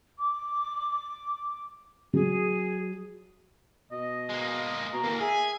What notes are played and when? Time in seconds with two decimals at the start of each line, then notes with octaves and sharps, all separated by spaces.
0.19 D6
2.13 F#3 G#4
3.91 B2 D#5
4.30 G#3 A#3
4.92 B2 A#5
5.04 D2 E3 A#3
5.20 G#4 E5 G#5